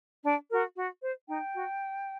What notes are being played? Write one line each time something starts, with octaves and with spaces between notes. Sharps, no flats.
D4
F#4 A#4
F#4
C5
D#4 G5
F#4